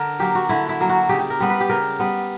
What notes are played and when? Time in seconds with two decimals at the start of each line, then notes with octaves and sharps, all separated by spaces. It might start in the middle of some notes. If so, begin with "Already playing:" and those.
Already playing: D3 A#4
0.19 F#3 A#3 G4
0.35 F#4
0.49 D3 E4
0.69 E4
0.80 F#3 A#3
0.89 F#4
1.09 C#3 G4
1.20 G4
1.30 A#4
1.40 G3 B3
1.50 B4
1.60 G4
1.69 C#3 A#4
1.99 G3 B3